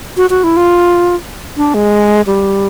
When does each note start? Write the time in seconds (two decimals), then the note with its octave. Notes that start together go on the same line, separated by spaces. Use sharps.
0.17 F#4
0.30 F#4
0.44 E4
0.57 F4
1.57 D4
1.74 G#3
2.27 G3